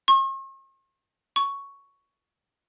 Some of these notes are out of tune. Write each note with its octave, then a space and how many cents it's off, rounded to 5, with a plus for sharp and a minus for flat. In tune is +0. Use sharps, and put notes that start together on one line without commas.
C#6 -45
C#6 +5